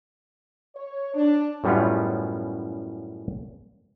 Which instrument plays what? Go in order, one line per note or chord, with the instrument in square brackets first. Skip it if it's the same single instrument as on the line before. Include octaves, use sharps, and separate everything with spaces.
[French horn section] C#5
D4
[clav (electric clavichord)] F#2 A2 G3 B3 C#4 F4